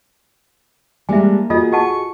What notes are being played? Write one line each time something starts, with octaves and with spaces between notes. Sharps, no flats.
G3 G#3 A#3 D4 E5 G#5
F4 F#4 G#4 A4 D#5
D#5 F#5 A5 C#6